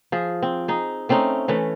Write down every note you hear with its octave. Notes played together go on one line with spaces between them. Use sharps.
F3 G#4
C4
D#4 G#4
A3 C4 C#4 D#4
E3 A3 C#4